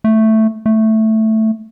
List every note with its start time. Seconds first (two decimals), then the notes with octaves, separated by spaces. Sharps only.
0.04 A3
0.66 A3